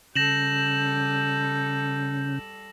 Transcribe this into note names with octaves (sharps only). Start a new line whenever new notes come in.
C#3 G3 A4 G6 A#6 E7 F#7